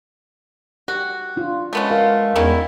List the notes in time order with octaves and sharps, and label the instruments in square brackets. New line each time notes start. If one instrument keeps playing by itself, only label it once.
[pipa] F#4 [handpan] G4
[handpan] D4 F4
[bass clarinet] G#3 [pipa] A3 B3 C#4
[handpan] F4 A#4 F5
[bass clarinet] E2 [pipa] D#3 C#4 E4